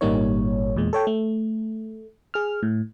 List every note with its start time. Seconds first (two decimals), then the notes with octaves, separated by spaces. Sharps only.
0.01 G#1 A#2 G3 A#3 D#4 C#5
0.76 E2 A#2 G#3
0.93 A4 C#5 G5
1.07 A3
2.34 G#4 F6
2.63 A2